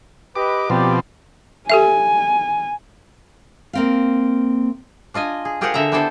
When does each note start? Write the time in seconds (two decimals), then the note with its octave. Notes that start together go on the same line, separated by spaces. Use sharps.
0.36 G4 B4 D#5 D6
0.70 B2 F3 C4 G4 D5
1.70 G4 A4 E5 G#5
3.73 A#3 C4 F5
5.14 D4 F4 D#5 G#5
5.45 G#4
5.61 F4 G4 G#4 A#4 C5 F#5
5.74 D3 E5 F#5 A#5
5.92 B3 D4 E4 G4 A4 C5